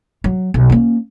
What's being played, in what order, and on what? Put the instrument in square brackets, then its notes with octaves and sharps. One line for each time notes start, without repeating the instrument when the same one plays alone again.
[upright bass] F#3
B1
A#3 C#4